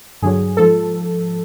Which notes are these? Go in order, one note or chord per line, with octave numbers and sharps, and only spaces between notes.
G2 D3 F#3 G#4
G#2 F3 A4